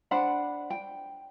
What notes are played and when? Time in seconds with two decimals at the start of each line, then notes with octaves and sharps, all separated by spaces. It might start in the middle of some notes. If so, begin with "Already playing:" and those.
0.11 D4 C5 F#5 B5
0.70 G5